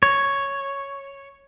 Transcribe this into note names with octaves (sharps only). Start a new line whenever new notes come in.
C#5